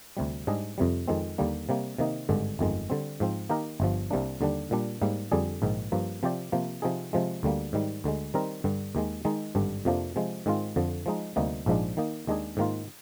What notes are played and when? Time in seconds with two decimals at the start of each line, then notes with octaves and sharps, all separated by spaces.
0.17 D2 C3 G3
0.47 G#2 G3 D4 G#4 D#5
0.78 F2 C3 G3
1.08 F2 D#3 G#3 C4
1.38 D#2 D3 G3 A#3
1.69 C3 G3 A#3
1.98 C3 D#3 A#3 D#4
2.29 G#1 G2 D3 G#3
2.59 G1 F2 D#3 G#3
2.90 D3 G3 C4
3.20 G#2 F3 C4
3.50 D#3 A#3 D#4 G4 A#4
3.80 G1 G2 F3
4.11 C2 C3 G3 A#3 D4
4.41 D#2 D3 G3 D4
4.71 A#2 G3 D4
5.02 G#2 G3 A#3
5.32 F2 D3 G3 D4 G#4
5.62 A#1 G#2 D#3
5.92 G2 F3 A#3
6.23 C3 F3 C4 G4 D5
6.52 C3 F3 A#3
6.82 C3 F3 C4 D#4 G#4
7.13 C3 F3 G#3
7.43 D2 D3 G3 A#3
7.73 G#2 D#3 G3
8.04 D2 D3 G#3
8.34 D#3 G3 C4 D#4 A#4
8.64 G2 D3 G3
8.95 D#2 D#3 G#3
9.25 D#3 G#3 D#4
9.55 G#1 G2 D3 G3 D4
9.85 F2 C3 F3 A#3 D4
10.16 C3 F3 G#3
10.46 G#2 D#3 G#3 C4 F4
10.76 F2 D3 F3
11.06 F3 G#3 D#4
11.36 D2 C3 G3 A#3 D#4
11.66 A#1 G#2 F3 G#3 D4
11.97 D#3 A#3 D#4
12.27 D#2 D#3 G#3 D4 G#4
12.57 G#2 D#3 A#3 F4